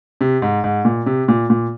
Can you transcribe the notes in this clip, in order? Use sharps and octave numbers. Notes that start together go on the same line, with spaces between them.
C3
G#2
G#2
A#2
C3
A#2
A#2